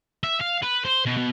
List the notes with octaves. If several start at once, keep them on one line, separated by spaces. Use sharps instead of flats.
E5
F5
B4
C5
B2
B2